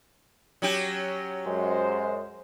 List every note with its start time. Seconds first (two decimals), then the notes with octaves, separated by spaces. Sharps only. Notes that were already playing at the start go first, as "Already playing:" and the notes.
0.62 F#3 C#4 G4
1.46 F#2 G#3 C5